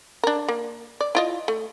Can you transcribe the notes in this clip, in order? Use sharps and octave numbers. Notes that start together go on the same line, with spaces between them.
D4 A#4
A#3
D5
E4 F4 D#5
A3